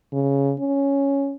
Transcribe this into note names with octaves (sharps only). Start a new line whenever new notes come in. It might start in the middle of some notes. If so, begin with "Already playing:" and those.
C#3
C#4